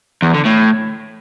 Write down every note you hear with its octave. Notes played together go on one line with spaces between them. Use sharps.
E2
D3
A2